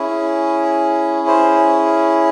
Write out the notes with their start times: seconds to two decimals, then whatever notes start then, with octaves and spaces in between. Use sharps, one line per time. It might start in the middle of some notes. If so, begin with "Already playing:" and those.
Already playing: C#4 E4 G#4
1.27 C5